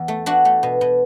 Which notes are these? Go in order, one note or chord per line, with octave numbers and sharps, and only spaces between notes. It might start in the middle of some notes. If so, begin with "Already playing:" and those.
Already playing: E2
A3
A3 D4 F#4
A3
B2
B2